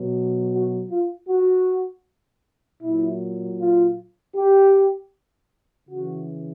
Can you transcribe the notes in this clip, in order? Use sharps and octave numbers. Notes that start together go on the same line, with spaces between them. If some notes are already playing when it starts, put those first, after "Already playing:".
Already playing: B2 F#3
F#4
F4
F#4
A#2 F#3 E4
F4
G4
C#3 E3 F#4